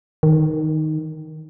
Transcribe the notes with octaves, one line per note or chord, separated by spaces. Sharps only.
D#3